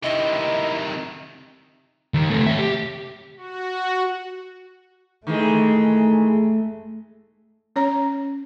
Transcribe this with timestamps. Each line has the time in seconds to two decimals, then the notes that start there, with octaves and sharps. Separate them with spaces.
0.03 C3 D#3 E4 D#5
2.14 D#2 D#3
2.30 C3 A3
2.47 C#5 E5
2.59 G4
3.37 F#4
5.27 D#3 E3 G#3 A3
7.76 C#4 C#5 A#5